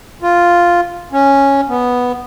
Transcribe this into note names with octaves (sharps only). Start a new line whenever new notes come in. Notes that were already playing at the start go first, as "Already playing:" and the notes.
F4
C#4
B3